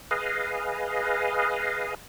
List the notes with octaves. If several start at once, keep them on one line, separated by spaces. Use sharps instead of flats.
G#4 B4 D#5 F5